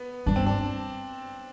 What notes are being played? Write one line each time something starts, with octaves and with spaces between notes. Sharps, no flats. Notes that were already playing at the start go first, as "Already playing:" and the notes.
Already playing: B3
G2 D4
C4
D4